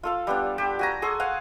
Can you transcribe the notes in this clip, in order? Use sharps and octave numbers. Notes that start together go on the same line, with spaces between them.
F4 A4 F5
G3 B3 D4
G4 A5
F#4 G#5 A#5
G#4 A4 C6 C#6
F5 F#5 G#5